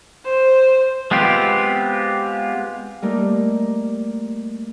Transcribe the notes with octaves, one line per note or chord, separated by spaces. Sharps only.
C5
G#3 B3 C4 F4 G4
G3 A3 A#3 D#4 A#4 D5